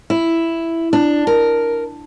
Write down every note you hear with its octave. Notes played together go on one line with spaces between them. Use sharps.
E4
D4
A#4